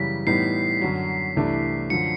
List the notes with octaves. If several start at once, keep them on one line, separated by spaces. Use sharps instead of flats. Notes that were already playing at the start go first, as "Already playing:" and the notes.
Already playing: F#2 C#3 E3 G3 B6
A2 E3 G3 B3 D#4 C7
F#2 D3 F#3
C2 C3 E3 A3 D4
F#2 D3 F3 C#7